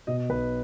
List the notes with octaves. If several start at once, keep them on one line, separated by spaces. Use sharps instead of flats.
B2 D#5
B1 B4